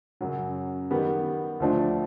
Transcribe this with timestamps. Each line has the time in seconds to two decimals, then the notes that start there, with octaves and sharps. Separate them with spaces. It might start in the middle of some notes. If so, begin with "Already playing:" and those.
0.21 F#2 C#3 F#3
0.91 D#3 G3 B3
1.60 D2 D3 F3 A3 D4